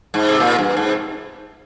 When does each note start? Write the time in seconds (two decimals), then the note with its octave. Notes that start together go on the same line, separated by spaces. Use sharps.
0.14 G#2
0.29 C3
0.40 A#2
0.58 G2
0.77 G#2
0.89 C3